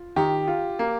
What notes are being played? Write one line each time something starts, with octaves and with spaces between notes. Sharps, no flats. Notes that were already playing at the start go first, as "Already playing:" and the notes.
Already playing: F4
D#3 G4
F4
A#3